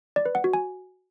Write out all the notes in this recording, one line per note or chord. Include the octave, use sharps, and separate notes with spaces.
D5
B4
F#5
F#4
G#5